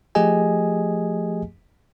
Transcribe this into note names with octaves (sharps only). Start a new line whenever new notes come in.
F3 A3 G4 G#4 D#5 G#5